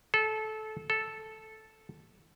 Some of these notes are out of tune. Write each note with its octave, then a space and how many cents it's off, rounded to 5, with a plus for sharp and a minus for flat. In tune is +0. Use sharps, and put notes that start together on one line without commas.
A4 -20
A4 -5